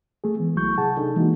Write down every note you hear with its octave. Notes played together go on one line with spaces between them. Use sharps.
A3 G#4
E3 G#3 B3
C2 F#3 A3 E4 C#6 G6
C3 G#4 F#5 A5
D4 D#4 G#4 A4
E3 G#3 A#3 D#4 E4 F#4